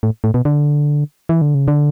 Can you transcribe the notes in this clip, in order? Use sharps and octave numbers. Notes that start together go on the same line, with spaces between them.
A2
A2
B2
D3
E3
D3
C#3
D3